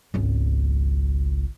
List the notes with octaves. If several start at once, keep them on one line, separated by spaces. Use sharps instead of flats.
G#1 C#2